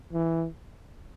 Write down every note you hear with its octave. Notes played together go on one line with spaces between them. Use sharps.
E3